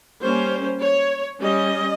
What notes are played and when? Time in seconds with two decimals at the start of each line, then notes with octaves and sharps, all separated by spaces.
0.23 G3 A#3 C#4 C5
0.82 C#5
1.42 G3 C#4 D#5